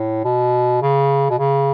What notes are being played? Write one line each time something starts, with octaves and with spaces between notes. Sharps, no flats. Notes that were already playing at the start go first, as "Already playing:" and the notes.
Already playing: A2
B2
C#3
B2
C#3